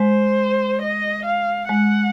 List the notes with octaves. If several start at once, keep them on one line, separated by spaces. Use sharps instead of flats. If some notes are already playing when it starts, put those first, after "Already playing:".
Already playing: G#3 C5
D#5
F5
G#3 F#5